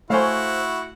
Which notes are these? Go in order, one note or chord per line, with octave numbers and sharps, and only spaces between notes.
A3 E4 F#4 C5 C#5 F5 G#5